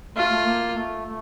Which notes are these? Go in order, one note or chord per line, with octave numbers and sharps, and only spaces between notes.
A3 F4
A3
A#3
A3
A3